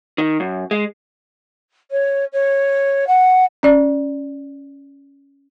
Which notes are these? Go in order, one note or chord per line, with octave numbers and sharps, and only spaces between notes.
D#3
F#2
G#3
C#5
C#5
F#5
C#4 D5